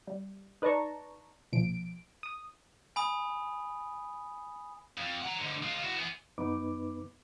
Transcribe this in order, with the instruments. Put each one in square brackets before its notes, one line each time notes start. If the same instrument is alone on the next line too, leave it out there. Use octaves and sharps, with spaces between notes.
[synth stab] G3
D#4 B4 D5 A5 A#5 C#6
B1 A#2 F3 D7
D#6
[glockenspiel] G#5 B5 D#6
[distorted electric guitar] F2
F#5 A#5
G#2 D3
G#3 F4
E4 F#4
B3 G#4
[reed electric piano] F#2 B3 D#4 B4 D6